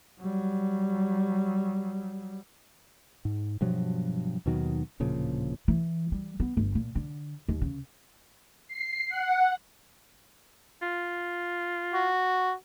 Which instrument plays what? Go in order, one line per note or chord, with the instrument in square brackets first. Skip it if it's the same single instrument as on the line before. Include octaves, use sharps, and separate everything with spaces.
[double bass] F#3 G3
[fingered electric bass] G#2
G2 B2 F3 F#3
D#2 B2 D#3 F#3
D1 A#2 C#3 F3
[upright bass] E3
G3
B3
G1
A#2
D3
D#2
C#3
[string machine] C7
F#5
[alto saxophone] F4
[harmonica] F#4